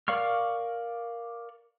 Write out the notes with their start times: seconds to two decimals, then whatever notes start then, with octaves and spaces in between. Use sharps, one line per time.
0.08 A#4 D5 F5 C#6 F6